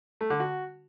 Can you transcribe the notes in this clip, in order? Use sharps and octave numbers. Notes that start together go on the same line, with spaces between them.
A3
D3
F#4